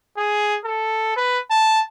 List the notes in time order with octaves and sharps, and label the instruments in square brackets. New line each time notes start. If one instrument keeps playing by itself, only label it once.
[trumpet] G#4
A4
B4
A5